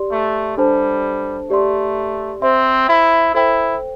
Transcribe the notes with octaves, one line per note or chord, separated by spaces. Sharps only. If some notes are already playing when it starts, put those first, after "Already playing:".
Already playing: G4 D5 C6
A3
G3 D4 A4 C5 A5
A3 G4 D5 C6
C4 C5 E5 C6
E4
E4 A4 C5 G5